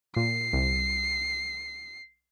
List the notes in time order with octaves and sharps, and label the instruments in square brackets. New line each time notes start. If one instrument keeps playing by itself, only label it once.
[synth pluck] A#2 [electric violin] C7
[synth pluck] C2